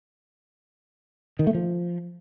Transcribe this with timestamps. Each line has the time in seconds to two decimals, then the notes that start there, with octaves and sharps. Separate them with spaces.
1.39 D#3
1.47 A3
1.54 F3